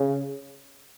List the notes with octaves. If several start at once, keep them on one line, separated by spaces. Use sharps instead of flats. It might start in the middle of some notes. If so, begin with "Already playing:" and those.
Already playing: C#3